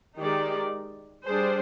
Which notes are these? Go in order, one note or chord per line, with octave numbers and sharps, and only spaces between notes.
D#3 G#3 D#4 G4 D5
G3 D4 G#4 C5